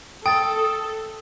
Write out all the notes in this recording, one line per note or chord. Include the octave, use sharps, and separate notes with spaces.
A4 G5 D#6 A6